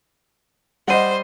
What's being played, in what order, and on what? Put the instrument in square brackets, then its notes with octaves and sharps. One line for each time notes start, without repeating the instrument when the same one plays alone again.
[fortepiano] G3 D#5 [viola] C5 [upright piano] F#5 D#7